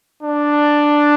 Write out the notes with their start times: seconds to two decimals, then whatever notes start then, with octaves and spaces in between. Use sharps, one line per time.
0.23 D4